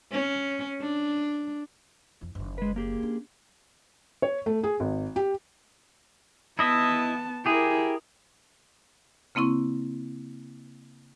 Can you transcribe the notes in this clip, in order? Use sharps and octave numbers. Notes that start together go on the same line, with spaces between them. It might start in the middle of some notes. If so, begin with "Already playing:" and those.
C#4
D4
F2 E4
F#1 D#3
G#3 B4
A#3 G4 G#4
C#4 D4
C#5
A3
G#4
G#1
G4
B3 E4 D#5 E5 A5
E4 G4 G#4 A#4
C#3 A#3 C4 E4 C#6